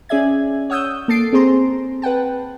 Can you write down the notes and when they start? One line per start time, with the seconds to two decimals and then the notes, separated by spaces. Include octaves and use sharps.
0.09 C#4 G#4 D5 E5 G#6
0.70 C#5 F#5 D#6 E6 G6
1.08 A#3 A4 A6 C7 D7
1.33 C4 G#4 C5 A#5 C6
2.02 B4 F#5 G5 A5